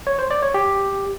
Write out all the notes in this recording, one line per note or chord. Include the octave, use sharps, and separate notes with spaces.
C#5
C5
D5
C#5
G4